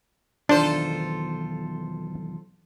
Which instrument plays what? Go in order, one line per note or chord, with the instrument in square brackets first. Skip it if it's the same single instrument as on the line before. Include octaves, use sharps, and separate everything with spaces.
[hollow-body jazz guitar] B1 E2 D#3 [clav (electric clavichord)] D4 [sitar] F4 A4 C5